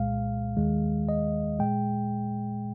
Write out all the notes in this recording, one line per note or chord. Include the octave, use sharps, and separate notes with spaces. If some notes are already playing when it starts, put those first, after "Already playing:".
Already playing: C2 A#2 G#3 F5
D#2 D#3 G#3
D#5
A#2 G#3 G5